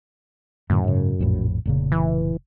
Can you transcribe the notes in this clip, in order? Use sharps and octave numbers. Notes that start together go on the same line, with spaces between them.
F#2 A2 D3 A3
G#2 C#3
A#1 F2 A2
F1 A#2 C#3
E3